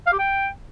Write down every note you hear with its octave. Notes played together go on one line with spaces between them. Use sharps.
F5
G4
G5